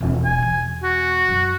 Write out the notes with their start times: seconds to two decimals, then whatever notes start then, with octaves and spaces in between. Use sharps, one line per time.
0.01 E1
0.25 G#5
0.39 E2 B2
0.84 F#4
1.28 F#2